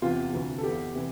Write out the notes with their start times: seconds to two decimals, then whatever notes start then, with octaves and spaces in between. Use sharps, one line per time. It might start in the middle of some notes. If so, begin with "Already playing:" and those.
0.02 E2 C3 E3 F4
0.33 D2 C3 E3
0.58 A4
0.63 E2 E3 G4
0.96 C3 E3